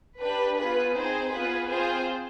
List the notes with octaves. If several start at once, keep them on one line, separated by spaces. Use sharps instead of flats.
D4 G4 B4
B3 F4 G#4 B4
C4 D#4 G#4 C5
B3 F4 G#4 B4
C4 F4 G#4 C5